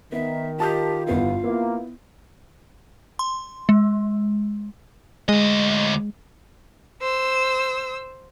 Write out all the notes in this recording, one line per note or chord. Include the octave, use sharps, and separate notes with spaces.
D#3 B3 E5
F4 G4 A5 D#6 G6
G1 B3 E4 F5
A#3 B3 E4
C6
G#3
D2 G#3 D#5
C5 E6